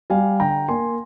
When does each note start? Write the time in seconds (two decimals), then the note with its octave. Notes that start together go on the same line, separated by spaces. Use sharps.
0.10 G3 F5 G#5
0.40 D3 G5 A#5
0.68 A#3 G#5 C6